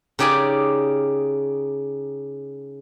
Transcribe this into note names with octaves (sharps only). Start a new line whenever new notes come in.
C#3 D#4 G4 D5 G#5 A5